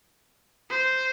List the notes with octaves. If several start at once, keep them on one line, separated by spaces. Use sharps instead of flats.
C5